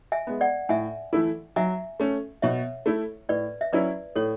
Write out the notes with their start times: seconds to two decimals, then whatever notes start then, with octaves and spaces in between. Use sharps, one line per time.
0.12 E5 G#5
0.27 G#3 B3
0.41 D5 F#5
0.69 A2 E5 G#5
1.13 E3 A3 E4
1.56 F#3 E5 G#5
2.00 A3 C#4
2.42 B2 C#5 E5
2.86 A3 E4
3.29 A2 B4 D5
3.61 E5
3.72 F#3 C#4 E4 B4 D5
4.16 A2 A4 C#5